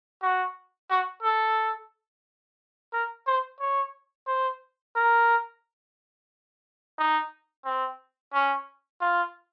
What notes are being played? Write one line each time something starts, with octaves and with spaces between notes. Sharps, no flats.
F#4
F#4
A4
A#4
C5
C#5
C5
A#4
D#4
C4
C#4
F4